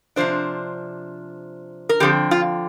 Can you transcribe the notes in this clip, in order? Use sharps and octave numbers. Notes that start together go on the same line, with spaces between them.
C3 F3 D4 C5
A#4
D3 F3 C4 G4
F4